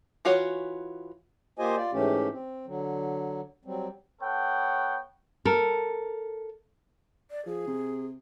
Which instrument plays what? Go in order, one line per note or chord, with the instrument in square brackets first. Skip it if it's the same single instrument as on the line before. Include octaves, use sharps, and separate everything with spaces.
[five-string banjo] E3 F4 F#4 C#5
[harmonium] A#3 F4 G4 C5 D#5 G#5
F4 D5
G#2 E3 A3 C#4 G4
C4
D3 F#3
F#3 G3 C4
[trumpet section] B3 A4 C#5 F#5 G5
[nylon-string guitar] A4 A#4
[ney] D5
[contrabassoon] F3 [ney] G#4
[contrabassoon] C3